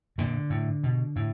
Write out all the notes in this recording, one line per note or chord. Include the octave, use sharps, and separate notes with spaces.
A#2 D3
A2
B2
A2